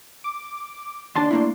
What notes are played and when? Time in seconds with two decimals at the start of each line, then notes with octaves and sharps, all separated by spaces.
0.24 D6
1.16 D#2 D4 A5 C6
1.31 A3 A#3 E4